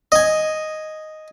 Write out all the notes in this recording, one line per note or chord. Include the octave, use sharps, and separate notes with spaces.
D#5 G#5